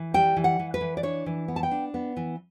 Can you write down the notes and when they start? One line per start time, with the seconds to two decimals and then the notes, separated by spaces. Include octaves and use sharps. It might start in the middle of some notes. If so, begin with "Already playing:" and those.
Already playing: E3
0.14 G3 G5
0.36 E3
0.44 F#5
0.59 E3
0.74 B4
0.81 E3
0.97 D5
1.03 D4 C#5
1.26 E3
1.48 B3
1.56 A5
1.63 G5
1.71 D4
1.94 B3
2.17 E3